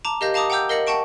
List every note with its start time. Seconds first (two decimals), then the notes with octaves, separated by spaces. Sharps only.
0.05 A5 A#5 D6
0.21 G4 A#4 D#5 F5 G6 A#6
0.34 F5 A5 A#5 D6 D#6
0.50 F#5 G5 A#5 D6 E6 G6
0.69 A#4 D#5 F5 A#6 C#7 F#7
0.87 F#5 G5 A5 C#6 D7